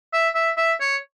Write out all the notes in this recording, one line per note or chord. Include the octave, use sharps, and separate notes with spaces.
E5
E5
E5
C#5